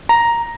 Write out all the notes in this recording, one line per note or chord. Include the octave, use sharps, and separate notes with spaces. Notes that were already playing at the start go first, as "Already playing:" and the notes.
A#5